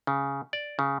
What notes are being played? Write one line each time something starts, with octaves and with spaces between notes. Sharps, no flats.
C#3
D5
C#3